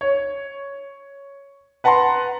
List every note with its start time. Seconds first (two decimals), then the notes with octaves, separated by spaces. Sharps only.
0.01 C#5
1.84 B4 F#5 A5 A#5 C6